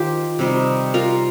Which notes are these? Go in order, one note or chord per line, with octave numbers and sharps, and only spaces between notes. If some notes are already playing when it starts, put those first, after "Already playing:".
Already playing: D#3 D#4 F4 G4 C5
C3 G3 D#4
F4 A#4